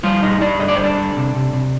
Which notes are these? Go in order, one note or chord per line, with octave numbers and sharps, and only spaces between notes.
F3 G3 F4
G2 D#4 D#5
G2 D4 D5
D3 D#5
D5
G2 C5
D4 D5
D3
C3
C3
C3